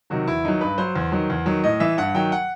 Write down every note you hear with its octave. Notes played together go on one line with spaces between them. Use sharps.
C3 D#3 F#3 F#4
E2 E4
D#3 F#3 D#4
G2 B4
F#3 C5
E2
D#3 F#3
E2
D#3 F#3
A2 D#5
E3 E5
G2 F#5
D#3 F#3 G5
F#5